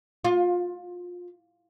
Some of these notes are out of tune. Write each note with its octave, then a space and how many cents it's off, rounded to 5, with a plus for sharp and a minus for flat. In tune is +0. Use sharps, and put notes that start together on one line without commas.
F4 +25